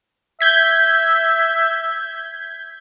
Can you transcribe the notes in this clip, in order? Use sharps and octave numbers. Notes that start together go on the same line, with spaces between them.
E5 G6 G#6 B6